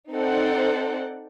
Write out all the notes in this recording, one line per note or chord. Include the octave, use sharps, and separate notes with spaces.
C4 D#4 A4 C5 D5 F#5